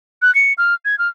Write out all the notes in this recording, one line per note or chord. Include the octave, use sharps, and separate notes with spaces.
F#6
C#7
F6
G#6
F6